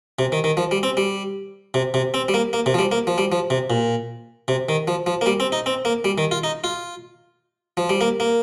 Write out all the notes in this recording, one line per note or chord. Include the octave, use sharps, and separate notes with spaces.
C3
D#3
D#3
F3
G3
C4
G3
C3
C3
C4
G3
A#3
A#3
C3
F3
G3
A#3
F3
G3
F3
C3
A#2
C3
D#3
F3
F3
A#3
G3
C4
D#4
C4
A#3
G3
D#3
F4
D#4
F4
F3
G3
A#3
A#3